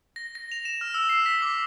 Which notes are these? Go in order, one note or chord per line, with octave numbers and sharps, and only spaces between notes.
A#6
A#6
F7
E7
F6
E6
C7
B6
D6